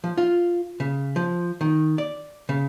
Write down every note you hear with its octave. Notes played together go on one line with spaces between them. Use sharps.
F3
F4
C#3
F3
D#3
D5
C#3